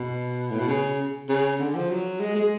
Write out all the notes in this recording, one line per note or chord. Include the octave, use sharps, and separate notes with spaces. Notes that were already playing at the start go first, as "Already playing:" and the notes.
Already playing: B2
A2
B2
C#3
C#3
D3
F3
F#3
G#3
G#3